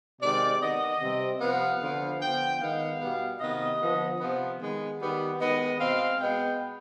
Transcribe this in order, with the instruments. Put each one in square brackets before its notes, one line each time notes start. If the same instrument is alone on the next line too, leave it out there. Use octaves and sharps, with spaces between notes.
[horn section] C3 D#3 G#3 C4 D5
D#3 B3 D#5
C3 G3 C4
C3 F3 B3 F5
D3 F3 B3
D3 F3 B3 G5
D#3 G#3 B3 F5
B2 G3 B3
C3 D#3 B3 D#5
D3 F3 B3
C3 F3 B3
D#3 G#3 B3
D#3 G3 B3
D#3 G#3 B3 D#5
B2 G#3 C4 F5
B2 G#3 B3 G5